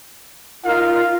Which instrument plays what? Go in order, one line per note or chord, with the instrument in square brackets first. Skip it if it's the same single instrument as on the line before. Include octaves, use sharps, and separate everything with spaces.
[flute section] D#4 F4 A#4 [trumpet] F5